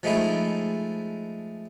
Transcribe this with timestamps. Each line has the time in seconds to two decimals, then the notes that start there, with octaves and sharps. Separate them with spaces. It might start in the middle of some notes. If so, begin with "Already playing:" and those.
0.03 F3 G#3 A3 D#4 E4